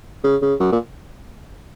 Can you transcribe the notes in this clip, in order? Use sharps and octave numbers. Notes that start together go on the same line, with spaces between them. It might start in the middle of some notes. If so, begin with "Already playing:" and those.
C#3
C#3
F#2
A#2